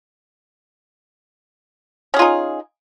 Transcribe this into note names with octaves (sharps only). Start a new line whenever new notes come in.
C#4 D#4 F4 G#4